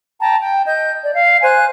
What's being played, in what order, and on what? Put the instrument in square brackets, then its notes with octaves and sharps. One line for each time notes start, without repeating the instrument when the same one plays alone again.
[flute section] G5 A5 A#5
G5
D#5 G6
D5
F5
C5 G#5 F#6